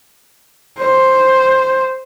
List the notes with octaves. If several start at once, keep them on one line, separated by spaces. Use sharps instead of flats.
C5